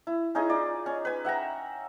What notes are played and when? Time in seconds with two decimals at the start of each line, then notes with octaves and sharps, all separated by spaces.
0.07 E4
0.35 C#4 D#4 E4 G#4
0.49 D#4 F4 D5
0.86 C#4
1.05 B4 G#5
1.25 E5 F#5 G5 A#5